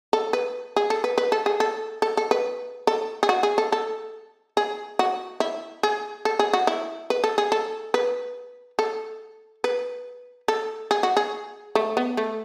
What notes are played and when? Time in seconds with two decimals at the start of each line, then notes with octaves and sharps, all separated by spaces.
0.13 A4
0.33 B4
0.76 G#4
0.90 A4
1.04 B4
1.18 B4
1.32 A4
1.46 G#4
1.60 A4
2.02 A4
2.17 A4
2.31 B4
2.87 A4
3.23 G#4
3.29 F#4
3.43 G#4
3.58 A4
3.72 A4
4.57 G#4
4.99 F#4
5.40 E4
5.83 G#4
6.25 A4
6.39 G#4
6.53 F#4
6.67 E4
7.10 B4
7.24 A4
7.38 G#4
7.52 A4
7.94 B4
8.79 A4
9.64 B4
10.48 A4
10.91 G#4
11.03 F#4
11.17 G#4
11.75 A3
11.97 B3
12.17 A3